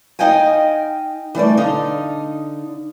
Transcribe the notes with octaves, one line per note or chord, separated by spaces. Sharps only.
D#4 D#5 F5 G5 G#5
E3 G3 A3 D5
D3 D#4 F5